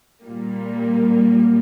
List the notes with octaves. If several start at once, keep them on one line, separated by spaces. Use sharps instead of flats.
A#2 G3 A#3